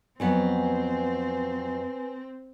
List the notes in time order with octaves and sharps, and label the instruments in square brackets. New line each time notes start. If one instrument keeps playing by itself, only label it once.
[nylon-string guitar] F2 F#3 B3 [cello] C4 [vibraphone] B4 G#5